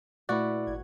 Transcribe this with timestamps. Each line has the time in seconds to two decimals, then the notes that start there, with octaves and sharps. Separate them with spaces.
0.29 A#2 A3 E4 F#4 B4 D5
0.67 G#1 G#6